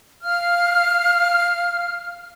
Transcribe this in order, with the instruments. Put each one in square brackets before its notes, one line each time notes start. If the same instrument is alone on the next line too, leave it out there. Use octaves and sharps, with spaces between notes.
[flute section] F5 F6